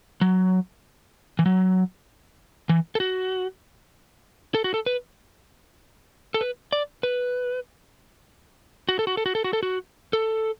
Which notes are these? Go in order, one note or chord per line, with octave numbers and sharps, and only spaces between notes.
F#3
E3
F#3
E3
A4
F#4
A4
F#4
A4
B4
A4
B4
D5
B4
F#4
A4
F#4
A4
F#4
A4
F#4
A4
F#4
A4